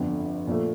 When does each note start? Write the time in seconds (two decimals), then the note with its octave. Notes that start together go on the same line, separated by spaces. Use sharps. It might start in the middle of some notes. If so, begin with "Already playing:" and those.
Already playing: G1 F2 D3
0.47 A#2 F3 A3